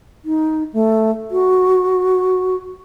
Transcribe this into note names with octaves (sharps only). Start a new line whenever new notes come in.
D#4
A3
F#4